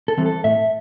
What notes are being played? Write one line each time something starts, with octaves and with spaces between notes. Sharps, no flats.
A4
E3 G3 C4
A4
A2 E5